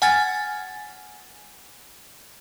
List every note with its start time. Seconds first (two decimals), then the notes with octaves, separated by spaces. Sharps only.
0.02 F#5 G#5 F6 G#6 A6